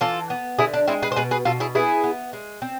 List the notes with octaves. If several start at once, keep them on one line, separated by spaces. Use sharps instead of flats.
E3 F4 A4
B3
D3 E4 G#4
D4
G#3 C4 E4
G#4 B4
C5
B2 G#4 B4
G#4 B4
B2 F4 A4
E4 G#4
B3 E4 G#4
B3
G#3
C4